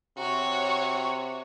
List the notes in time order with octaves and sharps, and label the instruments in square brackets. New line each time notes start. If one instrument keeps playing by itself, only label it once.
[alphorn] C3 [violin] F#4 C#5